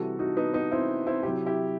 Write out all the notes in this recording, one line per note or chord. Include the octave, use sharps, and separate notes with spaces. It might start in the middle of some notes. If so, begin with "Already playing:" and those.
Already playing: C3 E3 G3 F#4 A4
D#4 F#4
B3 D#4
B3 D#4
C4 E4
C4 E4
C3 F#3 E4 G4
E4 G4